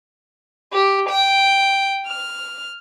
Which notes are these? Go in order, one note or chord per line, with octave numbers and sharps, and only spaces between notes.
G4
G5
F6